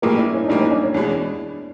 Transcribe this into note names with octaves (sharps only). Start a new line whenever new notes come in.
A#1 A#2 G3 A#3 G#4 A#4
D4 E4
C#4
D#4
A#1 A#2 G3 A#3 D4
C#4 D#4
D4
C#4
E2 B2 G#3 D4